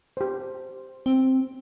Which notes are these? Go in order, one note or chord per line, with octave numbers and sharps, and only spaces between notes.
G4 C5
C4